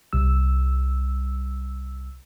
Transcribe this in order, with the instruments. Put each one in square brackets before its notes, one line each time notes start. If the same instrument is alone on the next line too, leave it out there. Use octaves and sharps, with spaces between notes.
[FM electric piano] C2 G3 E6